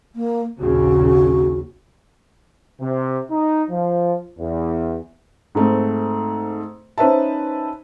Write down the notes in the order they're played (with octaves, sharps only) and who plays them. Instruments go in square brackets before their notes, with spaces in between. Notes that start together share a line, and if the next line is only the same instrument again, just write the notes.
[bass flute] A#3
[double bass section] A#1 D#2 C#3 [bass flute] F#4
[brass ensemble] C3
D#4
F3
E2
[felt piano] G#2 A3 C4
C#4 D#4 B4 C5 E5 A5